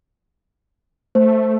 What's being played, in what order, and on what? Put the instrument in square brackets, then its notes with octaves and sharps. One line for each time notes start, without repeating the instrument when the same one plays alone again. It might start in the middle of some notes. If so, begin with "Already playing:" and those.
[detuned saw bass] A3 [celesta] C5